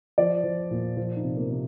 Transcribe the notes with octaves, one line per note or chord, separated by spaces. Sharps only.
F3 D5
F3
A#2
F3 F4
D#4
C3
A#3
C3